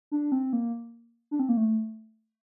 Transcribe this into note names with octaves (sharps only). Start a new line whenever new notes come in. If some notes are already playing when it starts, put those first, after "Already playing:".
D4
C4
A#3
D4
C4
A#3
A3